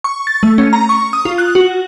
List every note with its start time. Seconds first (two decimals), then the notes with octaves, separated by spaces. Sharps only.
0.04 C#6
0.27 A6
0.43 A3
0.58 C#4
0.73 A#5
0.89 C#6
1.13 D#6
1.25 F4
1.38 F#6
1.55 F#4